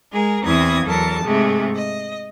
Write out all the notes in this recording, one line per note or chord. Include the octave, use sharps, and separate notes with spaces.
G#3 G#4 A#4
E2 C4 E4 D#6 G#6
E2 F#3 A4 A#4 A5
G#2 C3 G#3 A3
D#5